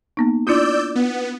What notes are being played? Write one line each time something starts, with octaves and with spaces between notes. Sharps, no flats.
A#3 B3 D#4
D4 E4 F4 D5 E6 G6
B3